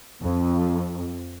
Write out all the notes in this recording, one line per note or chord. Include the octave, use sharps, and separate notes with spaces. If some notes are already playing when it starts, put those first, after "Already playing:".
F2